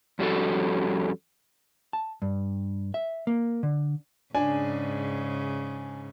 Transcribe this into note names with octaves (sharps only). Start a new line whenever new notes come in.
F2 G3 C#4 F#4 A4
A5
G2
E5
A#3
D3
G#2 C#3 D4 G#5